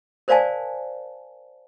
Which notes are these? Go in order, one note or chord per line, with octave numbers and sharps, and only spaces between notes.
A#4 C5 D5 F5 G#5 A5